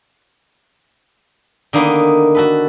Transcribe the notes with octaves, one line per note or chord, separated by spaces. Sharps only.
D3 D#3 A#3 B3 D#4
F#4 A4 B4